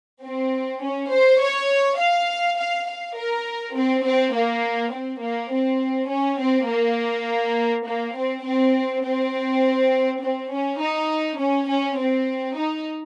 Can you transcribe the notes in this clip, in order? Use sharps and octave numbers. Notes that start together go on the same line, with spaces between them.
C4
C#4
C5
C#5
F5
F5
F5
A#4
C4
C4
A#3
C4
A#3
C4
C#4
C4
A#3
A#3
C4
C4
C4
C4
C#4
D#4
C#4
C#4
C4
D#4